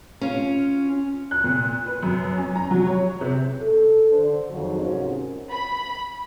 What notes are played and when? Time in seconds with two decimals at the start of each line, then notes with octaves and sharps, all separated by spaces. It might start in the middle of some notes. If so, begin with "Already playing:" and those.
0.21 C#4 F4
1.31 F#6
1.44 A#2
1.86 B4
2.03 F#2
2.38 C#4
2.56 A#5
2.71 F#3
2.87 C#5
3.21 C3
3.61 A4
4.11 D3 C5
4.51 F2 D#3 F#3 F#4 G#4 C5
4.82 G#2 C3 C#4 F4 F#4 A#4
5.52 B5